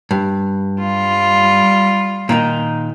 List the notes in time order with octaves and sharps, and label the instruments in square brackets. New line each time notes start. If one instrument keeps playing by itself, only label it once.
[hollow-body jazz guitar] G2
[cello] G3 F4
[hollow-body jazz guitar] A#2 D#3 D#4